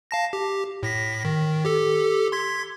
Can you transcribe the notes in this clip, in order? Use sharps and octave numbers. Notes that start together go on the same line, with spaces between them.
F5 A5 A#6
G4
A2 A#6 B6
D#3
G4 A4
C6 G#6 B6